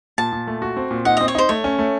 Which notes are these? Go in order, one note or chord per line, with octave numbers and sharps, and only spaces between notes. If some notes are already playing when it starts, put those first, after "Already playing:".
A#2 A5
A#2
A3
F#4
C4
A#2
D#4 F#5
C4 D#5
C#5
D#4 C5
A3 C#5
C#4
A3